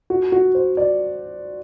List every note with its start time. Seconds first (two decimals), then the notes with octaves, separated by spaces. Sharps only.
0.10 F#4
0.32 F#4
0.55 C5
0.77 D5